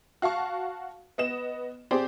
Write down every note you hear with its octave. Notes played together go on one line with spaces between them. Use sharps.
F#4 F5 A5 C#6
B3 D#5 E7
C4 G4 G#4 C5 D5